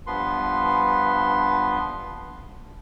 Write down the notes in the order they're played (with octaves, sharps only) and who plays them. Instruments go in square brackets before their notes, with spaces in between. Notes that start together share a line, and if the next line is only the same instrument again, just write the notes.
[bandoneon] G2 F3 B3 B4 C6